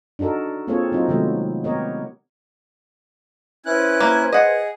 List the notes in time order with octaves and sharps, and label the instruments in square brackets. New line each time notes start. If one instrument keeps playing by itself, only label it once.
[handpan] D4 D#4 F#4 A4 A#4
A#3 C4 F4 G#4 A4 C#5
F#3 C4 D#4 F4
C3 D#3 F#3 G#3 A3 B3
B3 G4 A#4 C#5 D#5
[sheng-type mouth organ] C#4 E4 F#6 [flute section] B4 C5 G#6
[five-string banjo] A#3
[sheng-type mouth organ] G#4 [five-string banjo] D#5 F#5